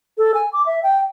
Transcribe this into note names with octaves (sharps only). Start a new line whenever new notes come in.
A4
G#5
D6
E5
G5